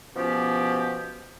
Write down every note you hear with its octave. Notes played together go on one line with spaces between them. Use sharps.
B2 F3 B3 C#4 G4